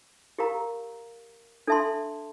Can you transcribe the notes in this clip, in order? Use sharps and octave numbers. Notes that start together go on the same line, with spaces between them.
G4 A#4 F5 A#5
D4 A4 E5 A5 C6